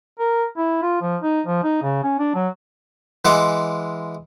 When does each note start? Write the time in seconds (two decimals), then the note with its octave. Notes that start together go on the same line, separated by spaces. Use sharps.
0.19 A#4
0.57 E4
0.82 F4
1.01 F3
1.22 D#4
1.47 F3
1.63 D#4
1.82 C#3
2.03 C#4
2.19 D4
2.35 F#3
3.25 E3 G#3 E5 F#5 C6 D6